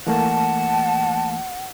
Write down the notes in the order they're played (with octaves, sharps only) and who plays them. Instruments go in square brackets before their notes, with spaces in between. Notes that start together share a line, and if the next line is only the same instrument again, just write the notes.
[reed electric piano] E3 A3 A#3 [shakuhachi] F#5 [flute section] A5